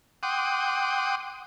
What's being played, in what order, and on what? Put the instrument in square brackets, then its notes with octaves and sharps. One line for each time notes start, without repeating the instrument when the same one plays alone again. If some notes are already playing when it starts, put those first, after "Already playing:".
[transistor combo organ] F#5 G5 C6 D6 D#6